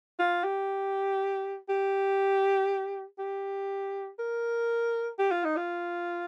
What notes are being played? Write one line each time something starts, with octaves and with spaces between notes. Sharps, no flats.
F4
G4
G4
G4
A#4
G4
F4
D#4
F4